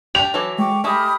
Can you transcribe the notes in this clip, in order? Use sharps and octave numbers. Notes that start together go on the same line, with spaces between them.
D4 G4 F7
E3 F#3 A4 D6
G#3 G5 C#6 D6
G#3 A3 G4 B5 D#6 F6